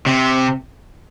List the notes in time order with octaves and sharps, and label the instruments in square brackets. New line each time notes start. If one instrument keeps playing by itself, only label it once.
[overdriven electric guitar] C3